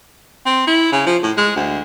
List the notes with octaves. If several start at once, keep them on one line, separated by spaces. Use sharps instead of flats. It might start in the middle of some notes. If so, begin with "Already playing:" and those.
C4
E4
C#3
F3
A2
G#3
D2